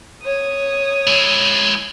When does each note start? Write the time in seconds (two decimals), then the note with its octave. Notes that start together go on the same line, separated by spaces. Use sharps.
0.23 C#5 D#6
1.07 G#3 E4